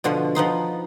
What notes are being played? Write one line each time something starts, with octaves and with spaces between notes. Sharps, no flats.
B2 D3 F3
F3 B3 D#4 C6